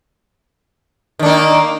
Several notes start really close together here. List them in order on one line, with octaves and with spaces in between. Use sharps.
D#3 D4 A#3